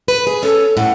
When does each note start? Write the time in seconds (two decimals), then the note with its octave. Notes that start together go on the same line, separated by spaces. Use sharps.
0.08 B4
0.27 G#4
0.43 C#4 A4
0.77 A2 F#5